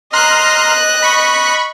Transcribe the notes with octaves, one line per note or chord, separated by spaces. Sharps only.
D#5 A#5 C6 F6 F#6
B5 C#6